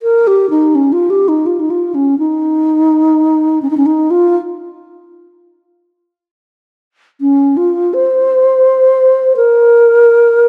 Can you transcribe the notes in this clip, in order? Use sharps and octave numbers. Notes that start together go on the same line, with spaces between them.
A#4
G4
D#4
C#4
F4
G4
D#4
F4
D#4
F4
C#4
D#4
C#4
D#4
C#4
D#4
F4
C#4
F4
C5
A#4